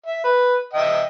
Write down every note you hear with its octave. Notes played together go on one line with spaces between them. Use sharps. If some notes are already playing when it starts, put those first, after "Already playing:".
E5
B4
D#5 E5 G5